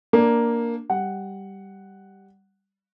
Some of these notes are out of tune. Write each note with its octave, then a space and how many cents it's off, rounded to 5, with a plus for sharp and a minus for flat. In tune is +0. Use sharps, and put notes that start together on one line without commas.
A#3 +0 D4 +0
G3 +0 F#5 +0